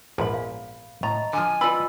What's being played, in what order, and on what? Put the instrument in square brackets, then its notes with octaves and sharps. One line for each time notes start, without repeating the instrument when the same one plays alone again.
[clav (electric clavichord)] A#1 E2 G#2 [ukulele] A#4 B5
[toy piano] F5
[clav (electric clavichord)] A2 [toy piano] D#5 [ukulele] A#5
[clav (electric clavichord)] D3 F3 [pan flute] G#5
[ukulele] F4 D5 B5 [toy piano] B4 D#5 E6